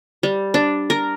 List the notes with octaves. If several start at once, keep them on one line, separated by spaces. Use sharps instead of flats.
G3
D4
A#4